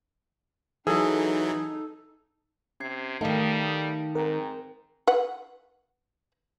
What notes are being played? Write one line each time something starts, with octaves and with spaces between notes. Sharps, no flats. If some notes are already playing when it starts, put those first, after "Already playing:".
E3 F#3 D#4 G#4 A4
C3 C#4 G#6 C7
D#3 G3 A3 D#4 F5 G5 A5 D#6
G#2 C4 A#4 G5 A#5
B4 F#5